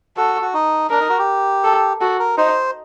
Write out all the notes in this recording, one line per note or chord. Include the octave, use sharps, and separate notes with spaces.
F#4 A4
F#4
D#4
D4 A#4
D#4
F#4
G4
A4
F#4 A4
A#4
D#4 C5